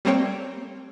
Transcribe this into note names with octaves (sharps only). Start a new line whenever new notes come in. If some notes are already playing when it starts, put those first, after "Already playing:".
G3 A3 A#3 C4 C#5 G5